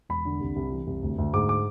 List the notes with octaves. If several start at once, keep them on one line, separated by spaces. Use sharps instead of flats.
E1 B5
D3
C2
C2
E3
C2
D2
D2
G#2 D6
D6